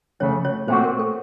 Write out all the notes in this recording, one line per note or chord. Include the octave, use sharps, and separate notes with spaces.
F2 C#3 A3 C#4 C#5
C#4 C#5
A#2 A3 C4 F#4 C5
A#4
A4